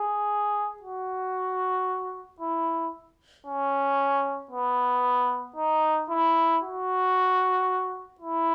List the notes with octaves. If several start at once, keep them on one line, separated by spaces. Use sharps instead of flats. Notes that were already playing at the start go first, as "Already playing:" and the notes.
Already playing: G#4
F#4
E4
C#4
B3
D#4
E4
F#4
E4